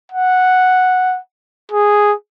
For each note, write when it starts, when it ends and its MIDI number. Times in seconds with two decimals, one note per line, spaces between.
0.12 1.18 78
1.72 2.13 68